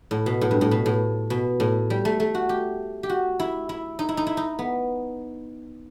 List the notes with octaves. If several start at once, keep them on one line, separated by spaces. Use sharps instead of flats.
A2
B2
A2
G2
A2
B2
A2
B2
A2
G3
A3
A3
F#4
G4
G4
F#4
E4
E4
D#4
E4
D#4
E4
D#4
B3